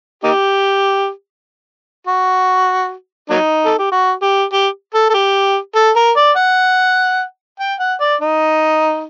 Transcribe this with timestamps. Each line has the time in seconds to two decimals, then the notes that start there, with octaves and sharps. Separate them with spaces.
0.24 A#3 D#4 G4
2.07 F#4
3.30 F#3 A#3 D#4
3.65 A4
3.79 G4
3.92 F#4
4.22 G4
4.53 G4
4.94 A4
5.10 A4
5.14 G4
5.76 A4
5.96 A#4
6.17 D5
6.36 F#5
7.60 G5
7.80 F#5
8.01 D5
8.21 D#4